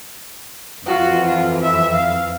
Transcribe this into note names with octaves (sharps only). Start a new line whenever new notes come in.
F2 E3 F4 F#4
F4
E5
F5